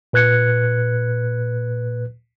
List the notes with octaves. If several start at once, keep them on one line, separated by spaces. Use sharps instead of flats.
A#2 B4 F#6 G#6 C#7